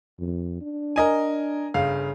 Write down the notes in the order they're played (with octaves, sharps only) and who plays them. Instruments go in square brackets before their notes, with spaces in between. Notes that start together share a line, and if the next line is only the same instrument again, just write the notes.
[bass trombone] F2
D4
[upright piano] A#4 D#5 G#5
G1 C#3 F5